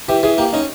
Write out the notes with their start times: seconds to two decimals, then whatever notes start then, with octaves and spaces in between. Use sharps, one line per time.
0.08 E3 G4
0.23 E3 G#4
0.38 A#3 G4
0.53 C#4 D#4